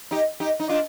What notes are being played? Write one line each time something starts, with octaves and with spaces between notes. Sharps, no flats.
D#4 G4
D#4 G4
D#4
D4 F4